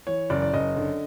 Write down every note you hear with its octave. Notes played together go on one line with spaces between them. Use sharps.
E3 C#5
F#1 D5
D5
F#1 D#5
D3